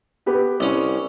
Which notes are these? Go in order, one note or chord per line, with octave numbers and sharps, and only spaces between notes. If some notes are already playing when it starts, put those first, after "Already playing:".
B3 G4 B4
C2 C#4